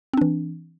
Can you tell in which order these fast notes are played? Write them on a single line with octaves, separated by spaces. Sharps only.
C4 D4 E3